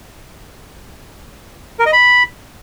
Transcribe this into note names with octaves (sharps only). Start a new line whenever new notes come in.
A#4
D#5
B5